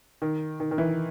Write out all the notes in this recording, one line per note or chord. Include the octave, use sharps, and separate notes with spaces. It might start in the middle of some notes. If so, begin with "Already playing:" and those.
D#3
D#3
D#3
E3